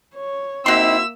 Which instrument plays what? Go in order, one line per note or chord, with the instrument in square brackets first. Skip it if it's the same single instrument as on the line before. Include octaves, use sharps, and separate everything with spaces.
[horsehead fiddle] C#5
[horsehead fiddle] A#3 E5 [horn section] C4 D#4 E4 [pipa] F#4 C6 [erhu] E6